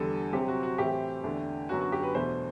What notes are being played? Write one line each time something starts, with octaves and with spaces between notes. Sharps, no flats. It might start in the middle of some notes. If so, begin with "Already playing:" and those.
Already playing: E2 D3 G3 A4
C3 F#3 C4 G4
F#4
F#4
A2 E3 A3 C4 G4
E2 D3 A3 D4
F#2 D3 F#3 B3 F#4
F#4
G4
B4
E2 B2 A3 D4 C5